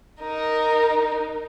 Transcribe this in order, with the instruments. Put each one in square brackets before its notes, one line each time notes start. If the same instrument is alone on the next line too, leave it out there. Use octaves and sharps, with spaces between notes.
[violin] D#4 A#4